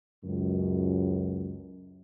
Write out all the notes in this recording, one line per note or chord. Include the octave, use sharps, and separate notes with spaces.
C#2 F#2